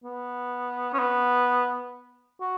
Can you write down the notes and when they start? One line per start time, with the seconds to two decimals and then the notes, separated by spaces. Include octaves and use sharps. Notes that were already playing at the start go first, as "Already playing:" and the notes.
0.04 B3
0.94 C#4
0.99 B3
2.41 F#4